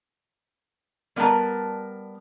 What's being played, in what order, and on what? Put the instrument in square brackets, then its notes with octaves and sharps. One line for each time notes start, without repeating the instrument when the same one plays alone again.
[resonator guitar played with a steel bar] G3 B3 A#4 F5 A5 A#5